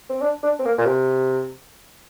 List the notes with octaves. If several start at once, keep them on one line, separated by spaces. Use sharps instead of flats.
C4
D4
D4
C4
A#3
A#2
C3